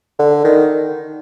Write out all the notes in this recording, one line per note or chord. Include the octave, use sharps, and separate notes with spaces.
D3
D#3